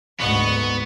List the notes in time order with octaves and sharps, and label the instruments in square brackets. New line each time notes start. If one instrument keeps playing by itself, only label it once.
[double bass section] F#1 D2 G#2 [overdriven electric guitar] B3 [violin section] D#5 F#5 C#6